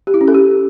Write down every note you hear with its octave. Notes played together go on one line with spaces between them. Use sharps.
G4
E4
C#4
A4
G4